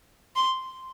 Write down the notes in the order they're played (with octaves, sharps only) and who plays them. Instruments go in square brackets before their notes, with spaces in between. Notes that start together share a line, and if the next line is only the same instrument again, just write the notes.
[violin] C6